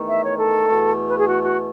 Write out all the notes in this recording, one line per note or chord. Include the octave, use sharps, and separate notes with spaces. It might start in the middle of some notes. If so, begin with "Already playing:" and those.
Already playing: E2 D#3 A3
E5
C#5
A4
E2 B2 A3
B4
G#4
F#4
F#4